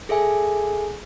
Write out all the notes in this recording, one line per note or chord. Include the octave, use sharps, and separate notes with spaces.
G#4 A4 E5 G#5